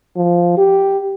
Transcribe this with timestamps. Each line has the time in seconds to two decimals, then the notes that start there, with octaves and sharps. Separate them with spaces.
0.17 F3
0.57 G4